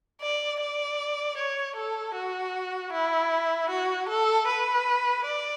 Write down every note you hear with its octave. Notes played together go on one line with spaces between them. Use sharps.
D5
D5
C#5
A4
F#4
E4
F#4
A4
B4
D5